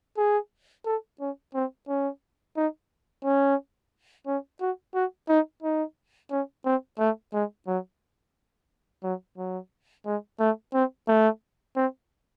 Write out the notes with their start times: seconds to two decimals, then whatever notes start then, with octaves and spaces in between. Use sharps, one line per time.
0.17 G#4
0.85 A4
1.20 C#4
1.54 C4
1.88 C#4
2.57 D#4
3.24 C#4
4.27 C#4
4.61 F#4
4.95 F#4
5.29 D#4
5.63 D#4
6.31 C#4
6.65 C4
6.99 A3
7.33 G#3
7.67 F#3
9.03 F#3
9.38 F#3
10.06 G#3
10.40 A3
10.74 C4
11.08 A3
11.76 C4